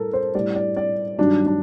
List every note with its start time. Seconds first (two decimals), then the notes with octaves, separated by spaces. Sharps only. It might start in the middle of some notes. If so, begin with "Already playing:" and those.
Already playing: A2 G3 A4 A#4
0.13 C5
0.34 A2 G3 D5
0.55 D5
0.77 D5
1.18 G2 D#3 F#3 D4
1.46 D4